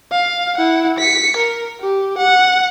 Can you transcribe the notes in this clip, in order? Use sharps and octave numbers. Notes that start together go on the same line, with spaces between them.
F5
E4 F#5
B6 C#7
A#4
G4
F#5